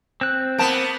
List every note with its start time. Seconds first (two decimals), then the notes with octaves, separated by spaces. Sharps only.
0.21 C4 F#6
0.58 A#3 B3 A5 D7